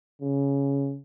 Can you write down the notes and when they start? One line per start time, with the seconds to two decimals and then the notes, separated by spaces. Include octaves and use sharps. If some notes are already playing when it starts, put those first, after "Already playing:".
0.22 C#3